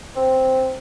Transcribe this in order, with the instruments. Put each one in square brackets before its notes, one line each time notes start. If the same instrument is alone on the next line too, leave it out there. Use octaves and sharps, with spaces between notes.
[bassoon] C4